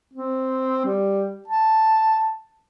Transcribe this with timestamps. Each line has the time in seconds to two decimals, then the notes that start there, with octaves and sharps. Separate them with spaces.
0.14 C4
0.86 G3
1.48 A5